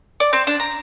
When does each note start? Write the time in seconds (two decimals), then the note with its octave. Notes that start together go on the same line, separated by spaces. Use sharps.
0.20 D5
0.33 C4
0.47 D4
0.60 A#5